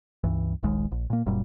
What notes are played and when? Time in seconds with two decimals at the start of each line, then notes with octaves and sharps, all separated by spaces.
0.24 C#2 G2 E3
0.63 D#1 A#1 D#2 G#3
0.92 A#1
1.10 A#2 A#3
1.26 F#1 F#2 A#2 G3